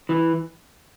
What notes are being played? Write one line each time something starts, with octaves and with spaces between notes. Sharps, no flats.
E3